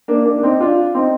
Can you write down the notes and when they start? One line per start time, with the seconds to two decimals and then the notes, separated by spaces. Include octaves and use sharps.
0.08 A#3 D4
0.26 A#3 D4
0.38 D4
0.43 C4 D#4
0.60 D4 F4
0.95 C4 D#4